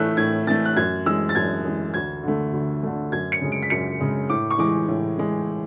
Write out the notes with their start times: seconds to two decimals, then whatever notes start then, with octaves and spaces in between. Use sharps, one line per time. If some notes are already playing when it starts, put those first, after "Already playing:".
Already playing: A2 E3 A3 E6 F#6
0.17 A2 G#6
0.47 E3 A3 A6
0.65 F#6
0.77 F#2 G#6
1.06 E3 G#3 E6
1.29 A6
1.35 F#2 G#6
1.65 E3 G#3
1.94 D2 G#6
2.23 D3 A3
2.53 D2
2.83 D3 A3
3.12 F#2 G#6
3.32 C#7
3.41 C#3 G#3
3.52 D7
3.63 B6
3.70 F#2 C#7
4.00 C#3 G#3
4.29 A2 D6
4.51 C#6
4.59 E3 G#3 D6
4.88 A2
5.18 E3 G#3